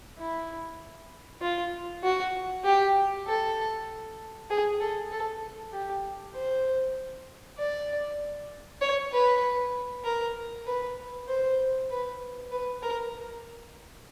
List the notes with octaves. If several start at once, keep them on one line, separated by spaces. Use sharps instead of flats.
E4
F4
F#4
G4
A4
G#4
A4
A4
G4
C5
D5
C#5
B4
A#4
B4
C5
B4
B4
A#4